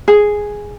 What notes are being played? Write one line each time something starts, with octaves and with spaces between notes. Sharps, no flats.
G#4